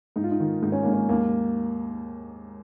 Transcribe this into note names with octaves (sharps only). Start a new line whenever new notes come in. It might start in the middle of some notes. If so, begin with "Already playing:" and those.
G#2 D#4
F4
D#4
D#3
G#2 D#4
C#4
G#2 A#3
C#4
D#2 A#3